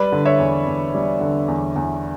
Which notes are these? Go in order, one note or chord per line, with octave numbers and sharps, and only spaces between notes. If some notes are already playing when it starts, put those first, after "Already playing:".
Already playing: G3 B4 D5
D3
C#5 E5
E2
E2
G3
D3
E2
E2